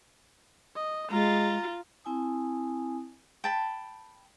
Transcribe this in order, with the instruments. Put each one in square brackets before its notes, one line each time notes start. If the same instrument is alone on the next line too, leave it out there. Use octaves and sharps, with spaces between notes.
[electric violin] D#5
[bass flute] G#3 [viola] F4 [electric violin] A#5 A6
[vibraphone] C4 E4 G#5 A5 D#6
[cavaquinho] G5 A5 B5